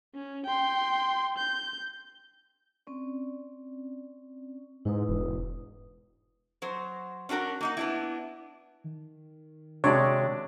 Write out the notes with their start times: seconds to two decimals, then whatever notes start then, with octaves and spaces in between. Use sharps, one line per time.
0.15 C#4
0.46 G5 C6
1.38 G6
2.87 C4 C#4 D5
4.85 G#2 E4 B4 D#6
5.09 E1
6.62 F#3 C5
7.29 C#4 D4 F#4 A#4
7.61 A#3 D#4 F#4
7.77 B3 D4 E4
8.84 D#3
9.84 C3 G#3 D4 F#4 C#5 D5